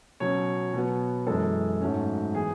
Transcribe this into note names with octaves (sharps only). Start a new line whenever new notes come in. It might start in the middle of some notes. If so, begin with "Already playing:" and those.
B2 F#3 C#4 C#5
B2 F#3 B3
F#2 E3 G#3 A4
G#2 F#3 A3 C#4
E3 B3 G#4